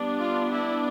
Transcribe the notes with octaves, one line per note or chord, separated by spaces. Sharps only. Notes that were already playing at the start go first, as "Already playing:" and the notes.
Already playing: G3 B3 D4
F4
E4